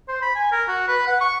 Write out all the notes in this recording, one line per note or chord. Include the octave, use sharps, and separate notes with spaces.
C5
B5
G#5
A#4
F#4
B4
F#5
C#6